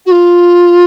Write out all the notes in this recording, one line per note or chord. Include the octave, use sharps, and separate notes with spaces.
F#4
F4